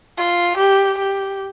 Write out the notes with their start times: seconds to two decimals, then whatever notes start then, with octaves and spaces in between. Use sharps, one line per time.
0.18 F4
0.58 G4
0.98 G4